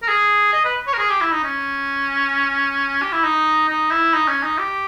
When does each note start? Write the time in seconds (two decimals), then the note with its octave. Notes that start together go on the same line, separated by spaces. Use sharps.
0.02 A#4
0.08 G#4
0.53 D#5
0.65 B4
0.87 C#5
0.93 A#4
0.98 G#4
1.10 G4
1.21 E4
1.32 D#4
1.44 C#4
3.02 G4
3.12 E4
3.24 D#4
3.69 D#4
3.91 E4
4.14 D#4
4.28 C#4
4.43 D#4
4.58 G4